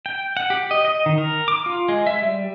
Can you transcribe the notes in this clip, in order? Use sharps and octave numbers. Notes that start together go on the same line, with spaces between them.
G5
F#5
G4
D#5
D#5
D#3
A#4
D6
F4
G#3
E5
G3